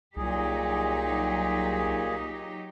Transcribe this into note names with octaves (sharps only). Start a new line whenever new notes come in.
C2 A#2 F#3 D#4 G4 G#4